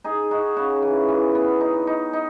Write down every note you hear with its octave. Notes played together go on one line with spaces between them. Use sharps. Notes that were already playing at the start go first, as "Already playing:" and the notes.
D#4 G#4
D#4 F#4
C#3 F#4
E3
E3
B3
D#4
D#4
D#4